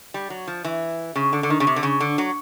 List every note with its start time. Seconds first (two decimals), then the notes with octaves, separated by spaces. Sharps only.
0.14 G3
0.30 F#3
0.47 F3
0.64 E3
1.16 C#3
1.33 D3
1.43 D3
1.50 D#3
1.60 C#3
1.67 C3
1.76 D3
1.83 C#3
2.00 D3
2.18 F#3